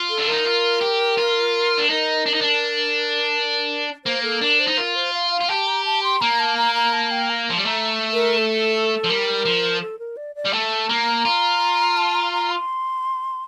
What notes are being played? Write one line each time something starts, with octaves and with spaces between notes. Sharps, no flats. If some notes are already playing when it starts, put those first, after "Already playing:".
Already playing: F4
A4
D4
D#4 A#4
F4
G4
F4
D4
D#4 A#4
D4
D#4
D4
A#3 C5
A4
D4 A#4
C5
D#4
F4 A#4
C5
F5
F5
F4
G4 A5
A#5
A5
C6
A#3 A#5
A5
A#5
A#5
A5
G5
A#5
F3
G3
A3 A#5
A#4
A4
F3
G3 A#4
F3
A4
A#4
D5
D5
G3
A3 A5
A#3 A#5
F4
A5
A#5
A#5
C6